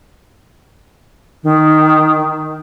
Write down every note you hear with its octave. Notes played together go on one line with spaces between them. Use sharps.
D#3